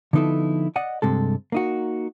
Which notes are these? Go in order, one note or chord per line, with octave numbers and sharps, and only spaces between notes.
D3 F3 B3 D#4 E4 A4
D5 D#5 F#5
G2 C3 G#3 A4
A#3 D#4 F#4